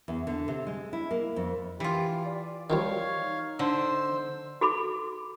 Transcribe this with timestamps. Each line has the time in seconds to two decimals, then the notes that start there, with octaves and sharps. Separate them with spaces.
0.08 E2
0.27 D3
0.48 C3
0.67 G#3
0.93 E4
1.11 A#3
1.36 F2
1.80 E3 F4 G4
2.25 D5
2.70 D#3 F3 G3 C#5 F5
3.24 D#4
3.59 D3 C5 E6
4.61 F#4 A4 B5 D6